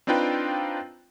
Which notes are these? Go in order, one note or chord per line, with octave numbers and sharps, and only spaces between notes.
C4 D4 D#4 F4 B4 G5